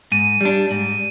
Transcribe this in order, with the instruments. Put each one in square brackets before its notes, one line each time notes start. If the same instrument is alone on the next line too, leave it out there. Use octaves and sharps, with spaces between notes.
[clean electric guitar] G#2 [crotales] D#7
[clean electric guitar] G3 D4
G#2